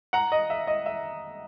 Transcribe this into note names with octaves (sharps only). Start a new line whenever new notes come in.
F#5 A#5
D#5
E5
D#5
E5